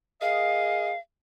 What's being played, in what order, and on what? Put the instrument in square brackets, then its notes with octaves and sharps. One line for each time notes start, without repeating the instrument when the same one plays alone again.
[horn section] G#4 A#4 D#5 [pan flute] F5